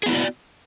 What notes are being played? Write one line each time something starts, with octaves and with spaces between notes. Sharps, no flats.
B3 E4 F#4 G#4 D5